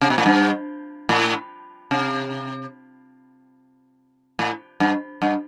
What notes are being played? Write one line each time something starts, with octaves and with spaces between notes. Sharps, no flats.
C3
B2
A2
G2
A2
C3
A2
G2
G2